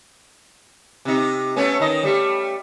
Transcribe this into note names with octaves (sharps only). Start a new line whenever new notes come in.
C3 D#4
A3 B3 C#4
D#3 D#4 D#5
G3 A3